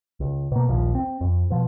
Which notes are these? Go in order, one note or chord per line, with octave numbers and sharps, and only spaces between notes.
C#2
B2 A#3
A#1 D#2 F3
C4
F2
B2 F3